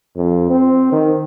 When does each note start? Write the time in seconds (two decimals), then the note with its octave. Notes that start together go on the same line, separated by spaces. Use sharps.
0.16 F2
0.50 C4
0.92 D#3